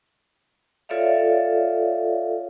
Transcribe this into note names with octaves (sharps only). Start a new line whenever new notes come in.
F4 A4 C#5 D5 E5 F5